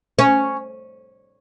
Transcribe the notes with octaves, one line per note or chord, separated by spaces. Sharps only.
C#4